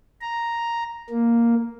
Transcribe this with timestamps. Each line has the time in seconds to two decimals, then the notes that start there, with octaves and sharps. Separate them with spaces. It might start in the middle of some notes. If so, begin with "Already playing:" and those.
0.21 A#5
1.10 A#3